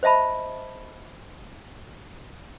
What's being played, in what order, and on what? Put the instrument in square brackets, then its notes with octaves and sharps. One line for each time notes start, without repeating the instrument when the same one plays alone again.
[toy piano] C5 D#5 E5 A5 B5